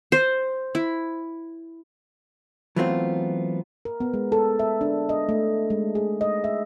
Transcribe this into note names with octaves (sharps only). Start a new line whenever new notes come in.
C5
E4
E3 F#3 A3 B3 C4 F4
A#4
B3
G#3
A4
E5
D4
D#5
A3
G#3
G#4
D#5
E5